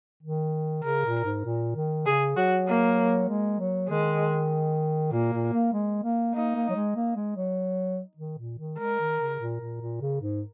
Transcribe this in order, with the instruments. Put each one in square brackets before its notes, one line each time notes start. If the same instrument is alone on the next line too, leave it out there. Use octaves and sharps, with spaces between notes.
[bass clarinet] D#3
[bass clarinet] C#3 [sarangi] A#4
[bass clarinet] A#2
G#2
A#2
D#3
[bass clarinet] C#3 [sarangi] G#4
[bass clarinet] F#3 [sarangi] F#4
[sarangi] A#3
[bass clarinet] G#3
F#3
[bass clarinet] D#3 [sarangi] G#3
[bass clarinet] A#2 [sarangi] A#3
[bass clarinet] A#2
A#3
G#3
A#3
[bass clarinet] A#3 [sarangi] D#4
[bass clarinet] A#3
F#3
G#3
A#3
G#3
F#3
D#3
A#2
D#3
[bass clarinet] G#3 [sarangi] A#4
[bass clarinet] D#3
C#3
A#2
A#2
A#2
C#3
G#2